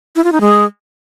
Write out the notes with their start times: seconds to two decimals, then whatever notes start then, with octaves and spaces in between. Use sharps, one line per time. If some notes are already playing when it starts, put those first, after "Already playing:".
0.16 E4
0.24 F4
0.32 D#4
0.41 G#3